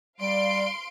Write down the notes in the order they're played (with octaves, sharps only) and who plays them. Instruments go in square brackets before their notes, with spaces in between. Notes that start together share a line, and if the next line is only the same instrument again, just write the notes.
[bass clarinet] G3 [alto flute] D5 [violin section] F5 C6 D7